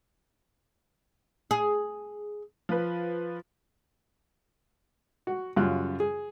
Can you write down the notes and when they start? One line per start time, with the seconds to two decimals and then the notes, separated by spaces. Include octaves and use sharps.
1.51 G#4
2.69 F3 B4
5.27 F#4
5.56 F#2 C#3 G3 F4 F#6
6.00 G#4